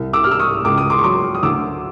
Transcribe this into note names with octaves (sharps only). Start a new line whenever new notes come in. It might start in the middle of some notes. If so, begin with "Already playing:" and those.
Already playing: C2
D6 E6
G3 F6
E6
C#6 D#6
C#2 D6
D#6
C6 D6
C#6
F#3 C6 D6
D#6
D2 D6 E6